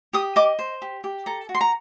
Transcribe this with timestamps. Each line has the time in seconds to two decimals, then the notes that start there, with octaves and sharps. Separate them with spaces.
0.13 G4 D#6
0.36 D#5 D6
0.59 C5
0.82 G4
1.04 G4
1.26 A4 A#5
1.49 F#4
1.55 C6
1.61 A#5